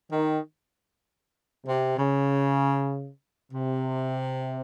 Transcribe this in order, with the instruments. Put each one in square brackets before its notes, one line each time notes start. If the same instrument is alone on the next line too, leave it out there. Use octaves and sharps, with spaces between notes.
[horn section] D#3
C3
C#3
C3